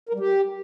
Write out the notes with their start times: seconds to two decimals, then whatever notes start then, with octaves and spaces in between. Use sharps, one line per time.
0.09 A#4
0.14 G3
0.20 G4